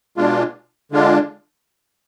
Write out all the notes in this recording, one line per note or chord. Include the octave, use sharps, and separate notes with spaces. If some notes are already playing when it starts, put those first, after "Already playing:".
B2 G#3 D4 F4
D3 G#3 D4 F4